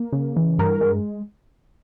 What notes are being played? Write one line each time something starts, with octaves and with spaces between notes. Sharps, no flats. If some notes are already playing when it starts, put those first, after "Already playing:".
Already playing: A#3
C#3
E3
G2 A#4
G#3